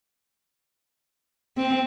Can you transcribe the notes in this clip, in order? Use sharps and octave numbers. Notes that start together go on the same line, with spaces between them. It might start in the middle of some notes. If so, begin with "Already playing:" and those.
C4